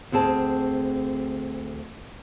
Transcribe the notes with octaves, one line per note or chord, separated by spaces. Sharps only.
D2 C4 G#4 A5